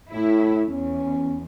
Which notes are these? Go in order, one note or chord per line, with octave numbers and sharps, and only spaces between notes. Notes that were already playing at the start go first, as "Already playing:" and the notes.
A2 E4
E2 C#4